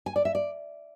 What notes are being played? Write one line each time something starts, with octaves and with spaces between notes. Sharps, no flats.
G#5
D5
E5
D5